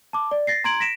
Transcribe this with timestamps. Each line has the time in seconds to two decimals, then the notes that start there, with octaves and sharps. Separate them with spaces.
0.13 A5 D6
0.31 D5
0.47 A6 A#6 C7
0.64 A#5 C6 G#6 D7 F#7
0.80 A#6 B6 D7 E7